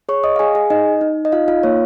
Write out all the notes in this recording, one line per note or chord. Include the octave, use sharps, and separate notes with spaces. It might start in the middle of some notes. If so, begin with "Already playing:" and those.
G#4 C#5 C#6
D#5 D#6
F5
G#4 G#5
G#4 G#5
D#4 D#5
D#4
D#5
D#4 F4 F5
F4 F5
A#3 C#5